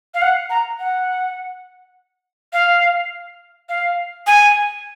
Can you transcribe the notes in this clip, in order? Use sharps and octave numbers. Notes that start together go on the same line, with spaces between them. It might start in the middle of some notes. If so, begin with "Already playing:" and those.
F5
F#5
A#5
F#5
F5
F5
G#5